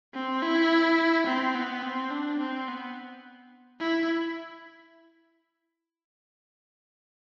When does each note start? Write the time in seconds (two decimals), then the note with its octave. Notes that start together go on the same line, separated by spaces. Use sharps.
0.15 C4
0.43 E4
1.27 C4
1.55 B3
1.83 C4
2.11 D4
2.40 C4
2.68 B3
3.80 E4